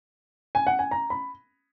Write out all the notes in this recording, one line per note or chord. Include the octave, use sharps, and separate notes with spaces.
G#5
F#5
G#5
A#5
B5